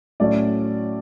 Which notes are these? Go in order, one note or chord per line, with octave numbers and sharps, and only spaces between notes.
A2 F#3 A3 C#4 D5